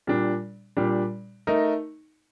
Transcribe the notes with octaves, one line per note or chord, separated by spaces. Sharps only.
A#2 G3 D4
A#2 G3 D4
A3 D#4 A#4